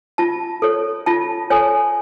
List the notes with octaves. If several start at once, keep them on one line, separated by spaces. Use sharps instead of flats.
F4 A5
A4 C#5
F4 A5
A4 C#5 G#5